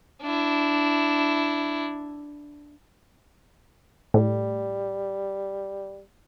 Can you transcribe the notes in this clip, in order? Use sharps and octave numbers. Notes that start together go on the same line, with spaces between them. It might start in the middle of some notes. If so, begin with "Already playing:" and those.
D4 E4
A2 G3